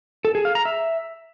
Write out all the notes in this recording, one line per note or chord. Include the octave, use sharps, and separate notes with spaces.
A4
G#4
F5
A#5
E5